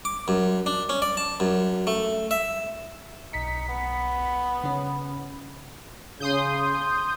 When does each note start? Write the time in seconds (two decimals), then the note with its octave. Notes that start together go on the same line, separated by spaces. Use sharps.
0.05 D6
0.28 F#2
0.66 D4
0.89 C#4
1.02 D5
1.17 A5
1.40 F#2
1.87 A3
2.31 E5
3.33 B1 D#4 B6 C#7
3.69 B3
4.63 C#3 C#4
6.20 C#3 C6 D#6 G6